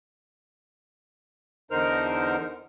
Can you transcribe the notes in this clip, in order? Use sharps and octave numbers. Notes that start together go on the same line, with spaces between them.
E2 D3 D#4 A#4 C5 F6